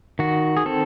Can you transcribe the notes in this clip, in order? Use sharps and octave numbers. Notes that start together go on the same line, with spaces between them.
D#3 F#4
G#4
C4 A4